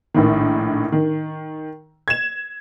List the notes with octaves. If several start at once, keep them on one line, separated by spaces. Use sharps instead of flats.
A#1 A2 D#3
D#3
G#6 E7